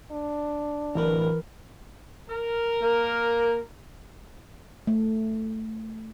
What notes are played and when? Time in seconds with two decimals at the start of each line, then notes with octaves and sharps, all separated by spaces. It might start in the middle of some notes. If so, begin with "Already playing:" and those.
0.12 D4
0.95 D1 E3 A#4 B4
2.30 A#4
2.82 A#3
4.87 A3